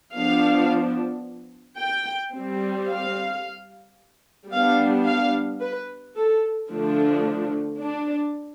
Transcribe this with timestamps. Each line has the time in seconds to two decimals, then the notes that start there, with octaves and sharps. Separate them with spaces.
0.15 F3 B3 D4 F5
1.79 G5
2.34 G3 C4
2.88 F5
4.51 G3 B3 D4 F5
5.06 F5
5.61 B4
6.15 A4
6.70 D3 F3 A3 D4
7.79 D4